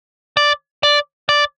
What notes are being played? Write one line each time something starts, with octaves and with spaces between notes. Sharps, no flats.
D5
D5
D5